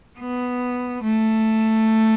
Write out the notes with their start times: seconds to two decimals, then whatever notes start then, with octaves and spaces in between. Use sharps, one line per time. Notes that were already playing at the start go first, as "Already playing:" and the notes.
0.19 B3
1.03 A3